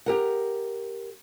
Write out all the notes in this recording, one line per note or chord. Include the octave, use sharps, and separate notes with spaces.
G4 A#4 F#5